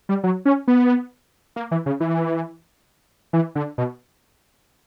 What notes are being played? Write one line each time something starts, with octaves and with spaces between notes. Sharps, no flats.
G3
F#3
C#4
B3
A#3
E3
C#3
E3
E3
D3
B2